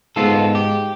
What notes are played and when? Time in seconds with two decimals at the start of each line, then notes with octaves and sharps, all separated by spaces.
0.16 G#2 B3 F4 A4
0.55 G4